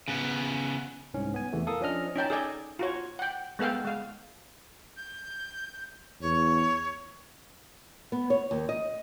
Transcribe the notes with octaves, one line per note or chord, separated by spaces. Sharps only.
C#3 B3
C2 G#2 C#4
B3 G#5
E2 C3 E3 A3
A4 A#4 F5 D#6
F3 C#4 D4 D#5 F6
C#4 D#4 G5 A5
G#4 A4 D5 D#5 G#5
F4 F#4 C#5
F#5 G5
G#3 B3 A4 F5 G5
G#3 F5
G6
E2 C#5
B3
C#5
D#2
D#5